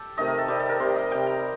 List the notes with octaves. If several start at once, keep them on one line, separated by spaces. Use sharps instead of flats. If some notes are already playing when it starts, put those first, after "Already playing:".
Already playing: G4 A4
C3 D#3 A3 D#5
A#4
A4
C3 G3 G4
A4
A#4
C3 G3 C5
D#5
C3 G3 G5
A#5